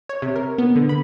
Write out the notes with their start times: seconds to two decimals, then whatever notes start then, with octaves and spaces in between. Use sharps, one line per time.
0.09 C#5
0.22 C3
0.36 A#4
0.58 B3
0.76 D3
0.89 B5